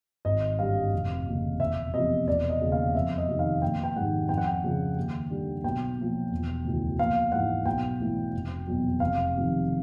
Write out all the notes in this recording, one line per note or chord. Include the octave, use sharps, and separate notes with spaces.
G#1 D#5
G2 D3 G3 F5
F1
D#2 C#3
E1 E5
E2 C3 F3 D#5
E1 D5
D#5
D#2 C#3
F5
F2 E5
D#5
C3 D#3
F5
A#1 G5
G5
G#2 D#3 G3 F#5
F2 G5
F#5
G5
C#3 F3
D#2
D3 G3
B1 G5
A#2 F3
E1
D2 C#3 E3
A#1 F5
G#2 E3 F#5
B1 G5
A2 E3
F1
E2 B2 F#3
F1 F5
F2 C3 D#3